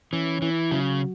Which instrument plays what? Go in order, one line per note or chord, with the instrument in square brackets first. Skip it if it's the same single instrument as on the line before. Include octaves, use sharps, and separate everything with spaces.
[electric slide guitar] E3 [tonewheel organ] C#4
[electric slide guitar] E3 [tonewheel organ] E4
[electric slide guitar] C#3 [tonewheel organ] F#3